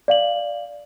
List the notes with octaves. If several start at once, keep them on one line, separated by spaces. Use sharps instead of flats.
D5 F5 F#7